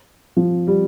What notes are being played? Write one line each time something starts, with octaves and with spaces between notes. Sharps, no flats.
F3
G3